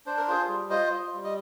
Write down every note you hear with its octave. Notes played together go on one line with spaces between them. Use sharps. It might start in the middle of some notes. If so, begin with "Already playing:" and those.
D4 C5
A#4
F4 G#4 C5
G3
F4 C5 D#5
F4
G3
D#5